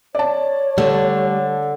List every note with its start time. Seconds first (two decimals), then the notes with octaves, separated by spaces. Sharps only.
0.15 C#5 D5 A5
0.78 D3 G3 A3